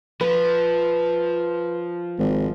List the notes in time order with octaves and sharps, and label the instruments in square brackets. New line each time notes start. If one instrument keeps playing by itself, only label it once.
[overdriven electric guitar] F3 [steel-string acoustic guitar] B4
[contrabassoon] G#1